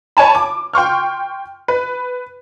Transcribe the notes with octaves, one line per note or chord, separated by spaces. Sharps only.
C#5 G#5 A5 B5
D6
G5 C6 C#6 F6
B4